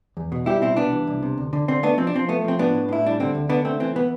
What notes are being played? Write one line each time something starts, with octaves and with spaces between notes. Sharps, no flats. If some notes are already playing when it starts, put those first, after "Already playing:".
E2
B2
G3 E4 G4
B2 C4 E4
C2 B3 D4
E3
C2
C3
D2
D3
D3 C4
A3 B3 D4
F3 C4
D4
F3 C4
A3 B3
F3 C4
A2 B3 D4
A2
A2 E4
G3 D4
D3 C4
D2
D3 B3 D4
A3 C4
E3 C4
E3 B3